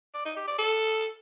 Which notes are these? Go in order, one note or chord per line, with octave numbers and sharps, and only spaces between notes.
D5
D#4
G4
D5
A4